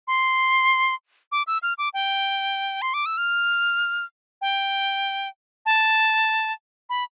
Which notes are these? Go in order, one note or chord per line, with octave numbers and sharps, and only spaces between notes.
C6
D6
E6
F6
D6
G5
C6
D6
E6
F6
G5
A5
B5